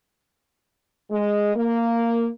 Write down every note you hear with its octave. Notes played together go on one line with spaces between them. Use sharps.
G#3
A#3